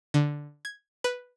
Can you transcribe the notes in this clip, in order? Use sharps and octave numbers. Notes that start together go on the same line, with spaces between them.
D3
G#6
B4